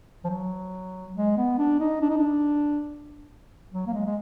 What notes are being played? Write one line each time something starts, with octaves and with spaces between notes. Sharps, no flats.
F3
F#3
G#3
B3
D4
D#4
D4
D#4
D4
F#3
A#3
G#3
G#3